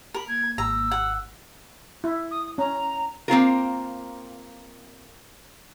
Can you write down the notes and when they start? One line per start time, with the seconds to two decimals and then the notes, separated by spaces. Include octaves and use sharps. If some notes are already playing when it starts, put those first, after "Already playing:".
0.14 A#4 B5
0.28 A#3 G#6
0.58 G#1 A#5 E6
0.91 F#5
2.04 E4
2.31 D#6
2.58 C#4 A#5
3.28 A#3 C4 F4 A#4